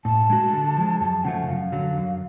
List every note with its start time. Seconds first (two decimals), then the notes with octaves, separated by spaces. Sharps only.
0.05 A2 A5
0.30 G#3 D4 F#4
0.53 D3
0.77 F3 G#3
1.00 F#2 A5
1.24 C#3 F3 A3 F#5
1.48 F#2 F5
1.72 D3 F#3
1.97 F#2